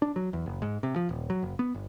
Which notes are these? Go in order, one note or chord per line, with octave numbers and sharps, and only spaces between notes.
D4
F#3
E2
F#1
G#2
C3
F3
D#1
F#3
F#1
B3
G1